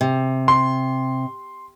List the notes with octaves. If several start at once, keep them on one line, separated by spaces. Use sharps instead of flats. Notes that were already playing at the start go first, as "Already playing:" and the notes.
C3
C6